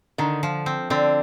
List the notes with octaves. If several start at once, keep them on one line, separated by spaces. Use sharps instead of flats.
D3 D#3
F3
C4
D3 C4